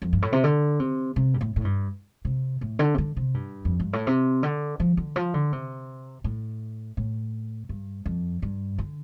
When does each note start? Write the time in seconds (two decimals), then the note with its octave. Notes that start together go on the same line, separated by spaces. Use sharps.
0.02 F2
0.13 G2
0.22 A2
0.32 C3
0.44 D3
0.80 C3
1.16 C3
1.34 G2
1.41 A2
1.56 A2
1.65 G2
2.25 C3
2.61 A2
2.79 D3
2.94 C3
2.98 D3
3.17 C3
3.34 G2
3.65 F2
3.80 G2
3.93 A2
4.07 C3
4.43 D3
4.80 F3
4.97 D3
5.16 F3
5.34 D3
5.52 C3
6.24 A2
6.97 A2
7.69 G2
8.06 F2
8.42 G2
8.78 D3